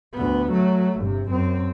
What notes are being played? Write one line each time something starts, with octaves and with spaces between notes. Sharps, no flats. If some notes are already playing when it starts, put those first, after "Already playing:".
D2 B3
F#3 A3
G1 C3
F#2 C4